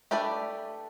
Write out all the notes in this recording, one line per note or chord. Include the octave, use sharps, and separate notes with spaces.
A3 D4 G4 B4 D5